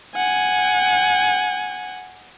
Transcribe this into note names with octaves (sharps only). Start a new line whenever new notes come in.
F#5 G#5